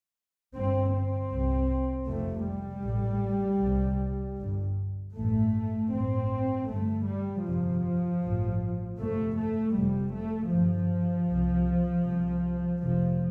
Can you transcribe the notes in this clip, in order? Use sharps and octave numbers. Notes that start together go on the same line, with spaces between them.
G1 G2 C4
C4
C2 C3
F1 F2 C3 A3
G3
A1 A2
C2 C3
G1 G2
A1 G2 A3
A1 G2 C4
G1 G2 A3
G3
G1 F2 C3 F3
A1 G2
G1 F2 C3 A3
A3
F1 F2 C3 G3
A3
G1 G2 F3
C2 C3
C2 C3
F1 F2 C3 F3